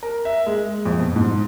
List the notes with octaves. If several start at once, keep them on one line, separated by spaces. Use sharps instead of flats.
A#4
E5
G#3
F2
B2
G#2